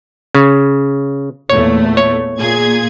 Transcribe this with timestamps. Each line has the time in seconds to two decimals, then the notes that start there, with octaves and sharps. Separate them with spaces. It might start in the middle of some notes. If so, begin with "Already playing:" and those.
0.35 C#3
1.50 E2 A#2 A3 C#5
1.97 C#5
2.39 A#2 G#4 G#6